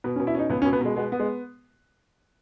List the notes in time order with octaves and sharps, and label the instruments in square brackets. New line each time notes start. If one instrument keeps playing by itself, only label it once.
[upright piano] B2 [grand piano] B3
[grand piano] C#4
[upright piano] B2
[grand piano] E4
[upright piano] C#4 [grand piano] D#4
[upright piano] C#2 [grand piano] B3
[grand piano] C#4
[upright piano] B2
[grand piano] B3
[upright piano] B2 [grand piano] G#3
[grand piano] G#3 [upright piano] B3
[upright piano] B3
[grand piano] G#3